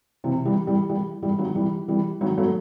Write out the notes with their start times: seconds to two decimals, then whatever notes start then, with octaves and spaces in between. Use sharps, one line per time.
0.24 C3 E3
0.45 E3 G3
0.67 E3 G3
0.89 E3 G3
1.22 E3 G3
1.39 D#3 F#3
1.55 E3 G3
1.88 E3 G3
2.21 D#3 F#3
2.37 F#3 A3